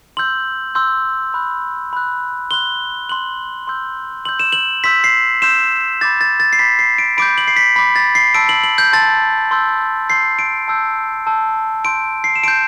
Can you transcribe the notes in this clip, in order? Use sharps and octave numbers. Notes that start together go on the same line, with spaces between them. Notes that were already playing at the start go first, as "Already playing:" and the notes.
C6 E6 G6 F#7
C6 E6 G6
B5 F#6
B5 F#6
C6 F#6 G7
C6 F#6 F#7
C6 E6 G6
C6 E6 G6 F#7
E7
F#7
C6 E6 G6 B6
C7
C6 E6 G6 E7
B5 D6 G6 A6
A6
A6
C7
B5 D6 G6 B6
C7
D7
B5 D6 G6 D7
F#7
C7
B6
B5 D6 G6 B6
A6
C7
A5 C6 E6 G6 D7
F#7
F#7
G6
A5 C6 E6 G6 A6
C6 E6 G6
C6 E6 G6 C7
D7
A5 E6 G6
A5 E6 G6
A5 C6 G6 D7
C7
E7
A5 C6 G6 D7